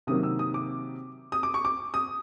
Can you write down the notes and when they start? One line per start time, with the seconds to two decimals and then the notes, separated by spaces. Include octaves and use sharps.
0.07 C3 D#3 F#3 A#3 D#6
0.23 E6
0.39 D#6
0.54 D6
1.32 D#6
1.43 D6
1.54 C#6
1.65 D6
1.94 D#6